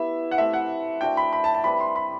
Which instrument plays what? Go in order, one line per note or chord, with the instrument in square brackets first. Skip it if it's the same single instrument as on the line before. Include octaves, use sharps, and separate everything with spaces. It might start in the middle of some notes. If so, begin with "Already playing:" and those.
Already playing: [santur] B3 E4 G4 [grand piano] E5
[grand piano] F#5
[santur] A3 C4 G4 [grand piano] E5
[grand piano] F#5
[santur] D4 F#4 C5 E5 [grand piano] G5
[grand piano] B5
B5
A5
A5
[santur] G3 C4 G4 B4 [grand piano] B5
[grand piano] C6
B5